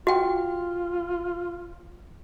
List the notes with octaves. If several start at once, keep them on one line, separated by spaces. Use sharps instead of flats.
F4 F#4 G5